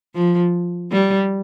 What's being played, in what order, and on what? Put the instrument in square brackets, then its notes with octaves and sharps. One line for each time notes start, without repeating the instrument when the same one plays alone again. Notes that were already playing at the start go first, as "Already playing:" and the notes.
[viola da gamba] F3
G3